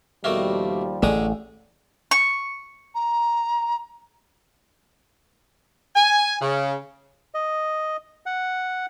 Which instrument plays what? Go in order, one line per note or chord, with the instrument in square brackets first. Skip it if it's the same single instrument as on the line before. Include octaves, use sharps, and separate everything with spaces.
[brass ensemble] D#2 F3 G3 [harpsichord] B2 A3 A#3
[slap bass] A1 A3 [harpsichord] D3 G#3 D#6
[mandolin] C#6
[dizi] A#5
[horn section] G#5
C#3
[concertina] D#5
F#5